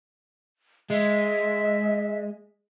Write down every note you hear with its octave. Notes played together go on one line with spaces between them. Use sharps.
G#3 D#5 E5